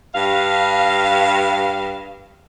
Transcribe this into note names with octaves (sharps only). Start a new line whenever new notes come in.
G2 F5